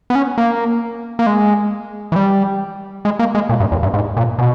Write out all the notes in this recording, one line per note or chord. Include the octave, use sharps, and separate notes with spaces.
B3
C#4
A#3
A#3
G#3
E3
G3
G#3
A#3
G#3
A#2
G2
E2
G2
G#2
A#2
B2